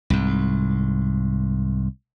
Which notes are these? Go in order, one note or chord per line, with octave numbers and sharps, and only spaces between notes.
C2 G#2